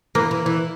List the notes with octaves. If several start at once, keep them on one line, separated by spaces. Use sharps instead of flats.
E3 A#3
E3
E3